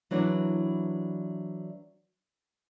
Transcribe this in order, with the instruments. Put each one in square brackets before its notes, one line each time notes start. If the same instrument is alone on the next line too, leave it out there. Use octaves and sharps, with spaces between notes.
[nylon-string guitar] E3 F#3 D4 E4 A#4 B4